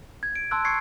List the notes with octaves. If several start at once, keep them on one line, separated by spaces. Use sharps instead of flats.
G#6
D7
A5 C6 E6 F#6
C#6 G#6 C7 C#7